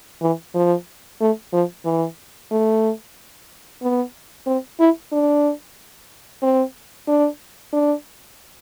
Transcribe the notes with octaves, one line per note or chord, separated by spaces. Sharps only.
E3
F3
A3
F3
E3
A3
B3
C4
E4
D4
C4
D4
D4